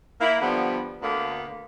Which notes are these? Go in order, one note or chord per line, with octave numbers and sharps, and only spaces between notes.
A#3 E4
D3 F3 G3 B3
D2 D3 A#3 B3 F5